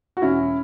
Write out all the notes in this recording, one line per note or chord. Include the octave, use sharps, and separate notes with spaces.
F#4
E1 C#4 E4